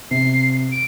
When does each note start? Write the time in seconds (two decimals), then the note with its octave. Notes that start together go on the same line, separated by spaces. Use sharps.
0.11 C3 C7
0.72 D7